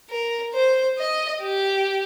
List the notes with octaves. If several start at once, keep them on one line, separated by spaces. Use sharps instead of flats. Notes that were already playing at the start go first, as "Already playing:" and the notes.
A#4
C5
D#5
G4